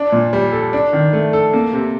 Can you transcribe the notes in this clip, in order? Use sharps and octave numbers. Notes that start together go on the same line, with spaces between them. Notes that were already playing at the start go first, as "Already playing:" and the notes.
Already playing: D4
A#2
G3
A4
D4
D#3
A3
A4
A#3
C3